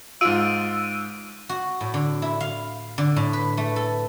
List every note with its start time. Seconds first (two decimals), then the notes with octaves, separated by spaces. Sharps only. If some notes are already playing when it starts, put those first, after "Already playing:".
0.21 G#2 F4 E6 D7 D#7
1.49 F#4
1.81 A2
1.94 D3
2.22 E4
2.40 F5
2.98 D3
3.16 A2
3.33 B4
3.57 A3
3.76 A4